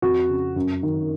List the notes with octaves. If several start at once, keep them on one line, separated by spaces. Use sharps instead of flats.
F2 F#4
C#3
F#2
D#3